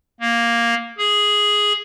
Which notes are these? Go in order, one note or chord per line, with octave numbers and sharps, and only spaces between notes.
A#3
G#4